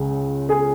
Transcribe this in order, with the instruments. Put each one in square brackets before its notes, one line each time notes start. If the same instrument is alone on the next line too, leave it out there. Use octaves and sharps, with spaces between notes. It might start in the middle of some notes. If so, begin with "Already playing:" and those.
Already playing: [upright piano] C#2 C#3 G#3
G#4